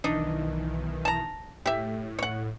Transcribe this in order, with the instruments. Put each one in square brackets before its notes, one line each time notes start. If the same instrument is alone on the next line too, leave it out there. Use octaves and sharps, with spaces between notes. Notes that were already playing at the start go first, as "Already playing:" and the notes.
[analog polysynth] B1 D#3 E3 [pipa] D4 D#4
[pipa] A5 A#5
[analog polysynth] A2 [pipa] G4 E5
[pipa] C#5 F#5